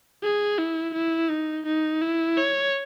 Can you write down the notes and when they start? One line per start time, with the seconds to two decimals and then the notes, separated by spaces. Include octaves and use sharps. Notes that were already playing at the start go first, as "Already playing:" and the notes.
0.23 G#4
0.58 E4
0.94 E4
1.30 D#4
1.66 D#4
2.02 E4
2.37 C#5